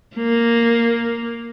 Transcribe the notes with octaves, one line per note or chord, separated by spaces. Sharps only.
A#3